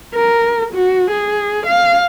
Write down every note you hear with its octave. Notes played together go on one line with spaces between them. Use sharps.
A#4
F#4
G#4
F5